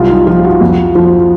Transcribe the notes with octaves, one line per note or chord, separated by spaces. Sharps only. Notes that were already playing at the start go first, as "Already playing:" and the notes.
Already playing: C2 F#3 F4
D#4
F3 F4
F#4
F2
F3